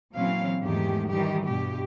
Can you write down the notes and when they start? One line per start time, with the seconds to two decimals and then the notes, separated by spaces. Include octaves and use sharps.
0.15 A#2 E3 F#3 C4 C#4 F5
0.62 E2 G#2 D#3 G#3 A3 G4
1.09 D#3 E3 G3 G4
1.45 G2 B2 G4